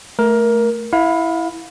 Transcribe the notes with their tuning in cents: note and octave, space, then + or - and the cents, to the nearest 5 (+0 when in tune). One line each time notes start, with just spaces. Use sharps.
A3 +0 A#4 +15
E4 +0 F5 +35